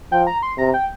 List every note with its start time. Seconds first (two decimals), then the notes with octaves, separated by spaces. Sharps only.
0.12 F3 G5
0.27 A#5
0.43 C6
0.58 C3 A#5
0.74 G5